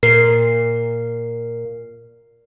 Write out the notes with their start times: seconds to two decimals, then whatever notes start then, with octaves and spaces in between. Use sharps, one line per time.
0.03 A#2 A#4 C7